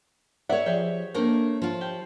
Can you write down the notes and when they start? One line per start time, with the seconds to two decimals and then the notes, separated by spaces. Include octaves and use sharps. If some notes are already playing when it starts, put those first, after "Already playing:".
0.49 A4 C#5 D5 E5 F#5
0.66 F3 G4 G#4 D5
1.14 A3 A#3 C4 D4 A#4 C5
1.62 F3 F4
1.81 G4